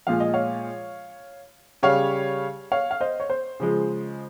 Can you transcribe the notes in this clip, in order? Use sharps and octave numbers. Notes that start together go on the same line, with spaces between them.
A#2 F3 G#3 F5
D#5
C#5 F5
C#3 G3 C#5 F5
C#5 F5
F5
C5 D#5
C#5
C5
C#3 F3 G#3